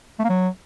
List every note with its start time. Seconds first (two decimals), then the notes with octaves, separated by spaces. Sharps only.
0.19 A3
0.24 A#3
0.29 F#3